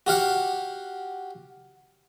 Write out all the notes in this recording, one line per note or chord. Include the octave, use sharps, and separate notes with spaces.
F#4 G4 F5 F#5